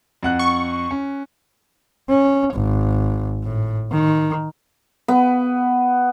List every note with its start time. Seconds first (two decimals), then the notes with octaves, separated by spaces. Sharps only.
0.23 F2 F#5 F#6
0.39 C#6
0.91 C#4
2.09 C#4
2.54 G#1
3.44 A2
3.91 D#3
5.08 B3